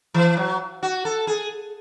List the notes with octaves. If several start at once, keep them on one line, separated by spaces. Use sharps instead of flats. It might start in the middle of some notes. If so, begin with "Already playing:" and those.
E3
F#3
F#4
A4
G#4